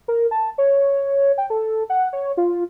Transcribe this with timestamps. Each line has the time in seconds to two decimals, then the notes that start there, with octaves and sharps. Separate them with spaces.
0.08 A#4
0.31 A5
0.58 C#5
1.38 G5
1.50 A4
1.90 F#5
2.13 C#5
2.37 F4